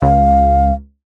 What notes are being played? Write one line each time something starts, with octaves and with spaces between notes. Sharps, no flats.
C#2 F5